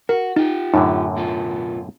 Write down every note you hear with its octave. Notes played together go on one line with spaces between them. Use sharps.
F#4 A#4
D#4 F4 G4
F#2 A2 D3 D#4
B2 F4